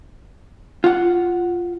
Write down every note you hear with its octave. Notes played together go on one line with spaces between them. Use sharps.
F4 F#5